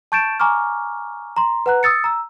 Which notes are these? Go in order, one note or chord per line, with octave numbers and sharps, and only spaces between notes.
A5 C#6 G6 A6 D7 E7
G#5 A#5 C#6 D6 F6
A#5 C6
B4 F#5 A#5 F#6
D#6 E6 A6 C#7
A#5 E6